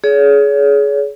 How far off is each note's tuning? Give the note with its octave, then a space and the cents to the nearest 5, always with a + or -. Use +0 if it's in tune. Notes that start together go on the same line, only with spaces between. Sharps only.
G#4 +25 C#5 +35